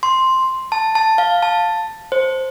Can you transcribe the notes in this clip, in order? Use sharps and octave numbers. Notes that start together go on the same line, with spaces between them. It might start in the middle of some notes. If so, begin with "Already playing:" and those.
C6
A5
A5
F5
A5
C5